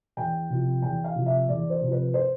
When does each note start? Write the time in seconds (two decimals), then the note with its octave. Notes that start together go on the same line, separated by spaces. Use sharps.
0.17 E2 G5
0.50 C3 F3
0.82 E2 G5
1.04 F5
1.15 C3 F3
1.26 E5
1.48 E2 D5
1.70 C5
1.81 C3 F3
1.92 B4
2.14 C5